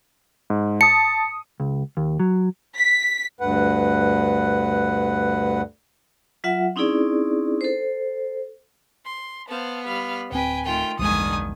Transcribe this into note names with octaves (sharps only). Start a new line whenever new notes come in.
G#2
A5 D#6 C#7
C#2
D#2
F#3
B6
D2 G2 B4 F#5
F#3 F4 E5 F#5
C4 C#4 D#4 E4 G#4 D5
A4 C5
C6
B3 C5 F5 A5
G3 F5 B5
D1 C4 B4 G5 G#5
D#3 A3 F4 G5
A#1 E2 G2 D3 D#3 G#3 G#5 D#6